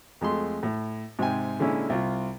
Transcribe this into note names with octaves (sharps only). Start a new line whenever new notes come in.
F2 G#3 A3 C6
A2
G#2 C3 G5 G#5
A#2 D3 G#3 C#4 E4
C2 F4